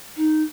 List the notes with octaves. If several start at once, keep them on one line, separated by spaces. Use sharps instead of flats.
D#4